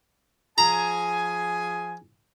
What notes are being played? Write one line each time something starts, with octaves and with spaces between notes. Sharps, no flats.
F3 G#4 G#5 A#5